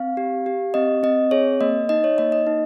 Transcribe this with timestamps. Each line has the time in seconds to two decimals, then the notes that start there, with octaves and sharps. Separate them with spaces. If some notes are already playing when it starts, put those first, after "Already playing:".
Already playing: C4 F5
0.17 G4
0.46 G4
0.74 C4 D#5
1.03 C4 D#5
1.31 G#4 C#5
1.61 A#3 D#5
1.89 D#4 D#5
2.04 C#5
2.18 A#3 D#5
2.32 D#5
2.47 D#4